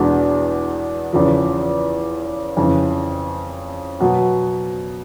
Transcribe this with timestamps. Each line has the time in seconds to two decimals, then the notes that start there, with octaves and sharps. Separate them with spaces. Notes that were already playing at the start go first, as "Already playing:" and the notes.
Already playing: E2 B2 G#3 B3 D4
1.13 E2 C#3 F3
2.57 F2 C#3 E3
4.00 B2 F#3 B3